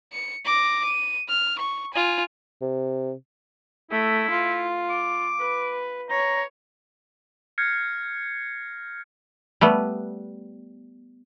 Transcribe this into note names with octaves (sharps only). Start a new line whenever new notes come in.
C#7
D6 A#6
D#7
F6
C#6
F4 G#5
C3
A3 E4
F4
D6
B4
C#5 A#5
F6 G6 G#6 A#6 C7 C#7
G3 A3 B3